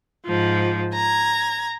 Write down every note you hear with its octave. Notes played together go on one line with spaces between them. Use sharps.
G#2 F3
A#5 G#6